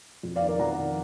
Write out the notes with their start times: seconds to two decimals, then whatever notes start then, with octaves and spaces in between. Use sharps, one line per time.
0.23 F2
0.36 D5 F5
0.41 D#3
0.48 A#4 D5
0.59 F2 F#5 A#5
0.77 D#3